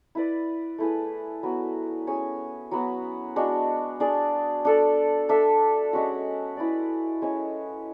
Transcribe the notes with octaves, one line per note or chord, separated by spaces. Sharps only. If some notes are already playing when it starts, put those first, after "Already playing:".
E4 B4 D5
A3 E4 G#4 B4
F#3 B3 F#4
C#4 G#4 C#5
F#3 B3 F#4
G#3 D4 F#4
D4 G#4 D5
D4 A4 D5
D4 A4 E5
G#3 C#4 F#4
E4 B4 D5
G#3 C#4 G#4 C#5